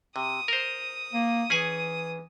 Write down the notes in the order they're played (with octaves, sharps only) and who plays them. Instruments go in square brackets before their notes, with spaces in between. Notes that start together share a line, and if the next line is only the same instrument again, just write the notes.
[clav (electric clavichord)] C3 [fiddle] D#6
[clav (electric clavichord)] A#4 C5
[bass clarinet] A#3
[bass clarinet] E3 [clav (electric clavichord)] C#4 G#4 G#5